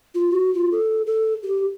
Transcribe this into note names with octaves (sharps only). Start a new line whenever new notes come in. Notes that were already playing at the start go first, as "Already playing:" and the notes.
F4
F#4
F4
A4
A4
G4